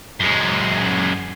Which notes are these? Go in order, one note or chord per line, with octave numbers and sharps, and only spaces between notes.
F#2 G#3